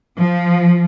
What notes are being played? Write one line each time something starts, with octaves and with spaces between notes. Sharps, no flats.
F3